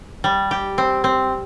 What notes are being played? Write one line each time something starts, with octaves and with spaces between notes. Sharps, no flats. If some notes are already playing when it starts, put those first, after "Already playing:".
G3
G4
C4
C4